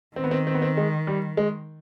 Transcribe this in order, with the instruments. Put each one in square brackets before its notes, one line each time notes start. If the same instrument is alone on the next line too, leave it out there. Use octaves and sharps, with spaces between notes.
[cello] D#3 [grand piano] C4
[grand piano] B3
C4
C4
B3
C4
G#3
G3
G#3